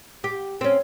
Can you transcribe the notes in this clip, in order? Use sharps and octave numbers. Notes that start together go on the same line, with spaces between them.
G4
C4 C#4